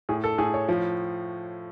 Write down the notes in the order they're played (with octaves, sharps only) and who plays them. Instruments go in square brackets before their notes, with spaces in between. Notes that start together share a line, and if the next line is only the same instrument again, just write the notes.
[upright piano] A2 G#4
A4
A2 G#4
C#5
F3